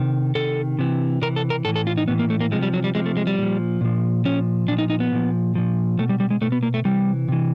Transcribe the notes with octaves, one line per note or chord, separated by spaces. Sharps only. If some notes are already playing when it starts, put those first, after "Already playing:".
Already playing: C3 D#3
C3 D#3 A4
C3 E3
C3 E3 A#4
A4
A#4
A2 E3 A4
A4
F4
D#4
A2 E3 B3
A#3
A3
A#3
C3 F3 G#3
G3
F#3
G3
C3 F3 G#3
A3
G#3
G3
A#2 F3
A#2 F3
A#2 F3 C#4
A#2 F3 D4
D#4
D#4
B3
A#2 F3
A#2 F3
B2 A3
G3
G3
G#3
B2 A3
B3
A#3
A3
C3 E3 G3
C3 E3